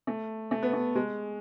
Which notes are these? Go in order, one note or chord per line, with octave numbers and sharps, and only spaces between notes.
A3
A3
B3
A3
G#3